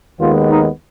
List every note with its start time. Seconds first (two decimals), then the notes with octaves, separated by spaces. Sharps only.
0.20 D#2 D#3 G#3 B3 F4
0.50 D#4